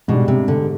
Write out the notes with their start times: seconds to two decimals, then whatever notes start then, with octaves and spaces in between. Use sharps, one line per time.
0.08 G#2 B2 G3 D4
0.28 C3
0.48 D3